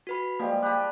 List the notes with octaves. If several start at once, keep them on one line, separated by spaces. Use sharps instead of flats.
F#4 B4 B5
F3 G3 G#3 A#3
G4 A5 B5 F#6